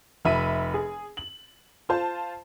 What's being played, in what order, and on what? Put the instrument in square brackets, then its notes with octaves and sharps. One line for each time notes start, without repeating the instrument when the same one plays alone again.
[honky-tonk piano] F1 E5 B5 D#7
G#4
F#7
F4 C5 A5